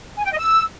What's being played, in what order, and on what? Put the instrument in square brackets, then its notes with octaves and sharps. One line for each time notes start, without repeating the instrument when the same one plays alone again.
[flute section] G#5
G5
D#5
E6